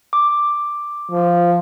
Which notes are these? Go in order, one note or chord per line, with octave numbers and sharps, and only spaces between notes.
D6
F3